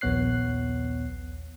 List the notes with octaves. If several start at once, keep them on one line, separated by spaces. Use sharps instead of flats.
A#1 D#2 B3 C#5 F#6 C7